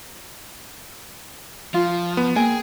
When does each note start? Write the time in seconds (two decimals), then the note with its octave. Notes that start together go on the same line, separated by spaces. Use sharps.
1.74 F3 F4
2.17 B3
2.36 A#3 G#4 G5 G#5